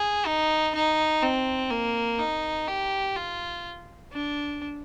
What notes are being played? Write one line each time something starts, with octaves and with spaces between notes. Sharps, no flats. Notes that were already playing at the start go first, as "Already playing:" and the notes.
Already playing: G#4
D#4
D#4
C4
A#3
D#4
G4
F4
D4